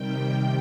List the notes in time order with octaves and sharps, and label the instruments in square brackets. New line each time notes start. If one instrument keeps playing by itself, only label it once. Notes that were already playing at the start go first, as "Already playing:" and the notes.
Already playing: [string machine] C3 D#3 G3 G5